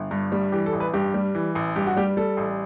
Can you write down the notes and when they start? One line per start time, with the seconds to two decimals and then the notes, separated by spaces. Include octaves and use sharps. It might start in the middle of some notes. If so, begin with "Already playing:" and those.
Already playing: G1
0.11 G2
0.32 G3
0.52 E3 G4
0.66 A4
0.73 A1
0.80 B4
0.94 G2 G4
1.14 G3
1.35 E3
1.55 A1
1.76 G2 G4
1.87 F#4
1.97 G3 G4
2.17 G3 A4
2.37 A1